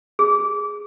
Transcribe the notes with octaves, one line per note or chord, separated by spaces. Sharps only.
G#4